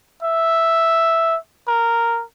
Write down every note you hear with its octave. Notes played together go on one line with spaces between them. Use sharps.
E5
A#4